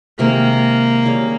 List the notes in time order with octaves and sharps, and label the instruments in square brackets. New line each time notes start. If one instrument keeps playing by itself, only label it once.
[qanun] C3 D#3 G#3 [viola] A#3
[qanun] D#3 G3 C#4 G#4